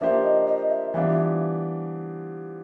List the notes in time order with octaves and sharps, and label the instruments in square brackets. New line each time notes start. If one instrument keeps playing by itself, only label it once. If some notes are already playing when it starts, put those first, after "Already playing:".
[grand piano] F3 A#3 D4 G4 C5 [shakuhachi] E5
[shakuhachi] D#5
D#5
E5
[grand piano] E3 G3 B3 D4 F4 [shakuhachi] E5
[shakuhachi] E5